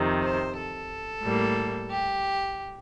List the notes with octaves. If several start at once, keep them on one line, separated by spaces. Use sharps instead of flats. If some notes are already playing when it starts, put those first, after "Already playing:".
Already playing: F2 C3 D#3
C5
A4
A2 G3 A#3
G4